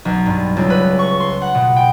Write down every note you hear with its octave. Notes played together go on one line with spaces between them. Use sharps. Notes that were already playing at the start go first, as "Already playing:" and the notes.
B1
G2
C#2
B4
C#6
C6
F#5
B2
G5